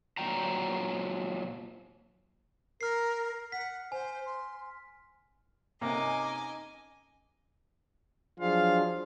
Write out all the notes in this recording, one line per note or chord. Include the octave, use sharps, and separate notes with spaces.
A#2 F#3 G5 A#5
A#4 F6 C7
F#5 B6
C5 G#5
C6
C3 A#3 C#4 D#4 A4 D#5 G#5 D6
F3 F#3 D4 F4 G#4 F5